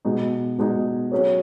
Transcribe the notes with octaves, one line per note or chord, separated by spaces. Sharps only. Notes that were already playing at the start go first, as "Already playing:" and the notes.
B2 G#3 D#4
B2 G#3 D#4
F#3 C#4 G#4 C#5